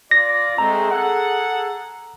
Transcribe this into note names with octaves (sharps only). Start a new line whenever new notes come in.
F4 D5 A#6
G#3 A3 C4 A#5
G#4 A4 F#5